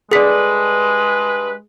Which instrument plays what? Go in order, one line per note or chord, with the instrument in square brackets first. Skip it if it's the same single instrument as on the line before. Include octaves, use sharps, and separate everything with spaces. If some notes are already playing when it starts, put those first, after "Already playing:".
[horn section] G2 B4 [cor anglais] G#3 [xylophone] G#4 B6 [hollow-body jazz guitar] A4 D5